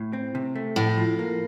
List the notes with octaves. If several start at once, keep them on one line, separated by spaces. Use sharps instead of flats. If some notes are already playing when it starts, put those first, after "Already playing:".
Already playing: A2
C4
C3
A3
F2 A2
F3
A#3